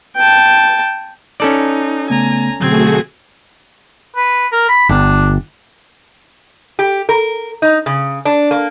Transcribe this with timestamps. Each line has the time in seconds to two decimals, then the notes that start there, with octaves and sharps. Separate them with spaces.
0.17 G5 A5
1.40 C#4 D#4 A4 D5
2.10 C#3 A3 B3 G#5 A#5
2.60 B2 D3 F#3 A3 C4 F#4 G#4 G#6
4.16 B4
4.52 A#4
4.69 B5
4.89 G1 D4
6.79 G4
7.09 A#4
7.62 D#4
7.86 C#3
8.25 D4
8.51 A#3